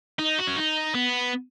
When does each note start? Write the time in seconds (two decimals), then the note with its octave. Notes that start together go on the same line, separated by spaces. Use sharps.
0.19 D#4
0.38 F#4
0.47 C#4
0.57 D#4
0.95 B3